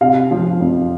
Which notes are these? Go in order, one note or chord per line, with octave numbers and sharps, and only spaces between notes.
C3 F5
F3
F2